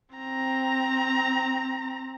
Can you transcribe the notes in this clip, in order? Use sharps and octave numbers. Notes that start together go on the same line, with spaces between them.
C4 A#5